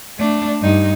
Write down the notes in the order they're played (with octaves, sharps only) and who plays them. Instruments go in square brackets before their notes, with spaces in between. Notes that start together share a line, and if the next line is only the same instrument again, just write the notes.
[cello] A3 D4
G2 D#4